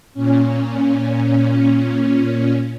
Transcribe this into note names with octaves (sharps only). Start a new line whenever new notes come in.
A#2 C#4